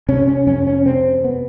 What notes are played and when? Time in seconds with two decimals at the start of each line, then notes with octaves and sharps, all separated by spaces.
0.09 C3 C#4
0.28 C#4
0.47 F2 C#4
0.67 C#4
0.86 C3 C4
1.24 B3